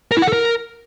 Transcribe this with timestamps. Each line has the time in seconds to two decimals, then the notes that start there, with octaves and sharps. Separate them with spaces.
0.12 A#4
0.17 E4
0.22 F#5
0.27 A4
0.33 A#4